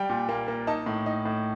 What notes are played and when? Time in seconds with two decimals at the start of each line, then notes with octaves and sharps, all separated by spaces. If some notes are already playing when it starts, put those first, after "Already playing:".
Already playing: G3 G5
0.09 A#2
0.29 A#3
0.48 A#3
0.67 D#4 A5
0.86 A2
1.06 D#4
1.25 A2